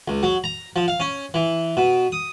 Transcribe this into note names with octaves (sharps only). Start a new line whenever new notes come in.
C#2
F#3
A#5
F3
F5
C#4
E3
B2
D#6